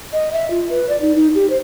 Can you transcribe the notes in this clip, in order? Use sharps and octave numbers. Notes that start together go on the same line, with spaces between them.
D#5
E5
F4
B4
D5
D#4
D#4
G4
C5